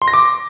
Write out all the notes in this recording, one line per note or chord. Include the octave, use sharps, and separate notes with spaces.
C6
A#6
D6